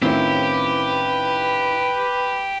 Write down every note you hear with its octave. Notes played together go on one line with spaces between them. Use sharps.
A2 D#3 C4 C#4 E4 F4 G4 B4